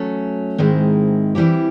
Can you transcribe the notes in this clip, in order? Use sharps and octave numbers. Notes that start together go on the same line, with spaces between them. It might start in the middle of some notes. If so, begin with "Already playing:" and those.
Already playing: F#3 A3 C#4
G#2 D#3 G#3 C4 E4
E3 G3 C4 E4 G4